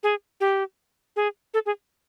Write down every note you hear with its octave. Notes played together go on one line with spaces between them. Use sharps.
G#4
G4
G#4
A4
G#4